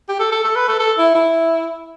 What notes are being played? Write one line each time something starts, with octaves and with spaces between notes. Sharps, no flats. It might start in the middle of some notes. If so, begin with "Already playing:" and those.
G4
A4
A4
A4
B4
A4
A4
E4
E4